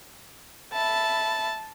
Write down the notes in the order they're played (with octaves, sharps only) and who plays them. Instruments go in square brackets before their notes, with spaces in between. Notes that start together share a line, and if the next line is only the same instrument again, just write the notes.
[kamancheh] E5 B5 [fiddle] A5